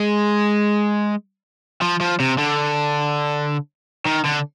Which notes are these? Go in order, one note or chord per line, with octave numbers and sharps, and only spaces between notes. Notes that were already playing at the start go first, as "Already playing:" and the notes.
Already playing: G#3
F3
F3
C3
D3
D#3
D3